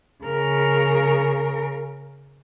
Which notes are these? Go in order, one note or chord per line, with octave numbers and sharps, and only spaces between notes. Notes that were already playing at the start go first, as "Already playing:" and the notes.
C#3 A#4